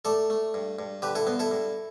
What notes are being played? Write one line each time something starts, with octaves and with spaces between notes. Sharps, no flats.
A3 A4 D5
A3
G2
G2
D3 G4 B4
E4 A4
G2 B3
E4 A4
G2